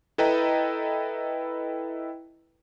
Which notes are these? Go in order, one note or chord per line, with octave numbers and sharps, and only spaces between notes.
E4 A4 B4 D#5 G5 A#5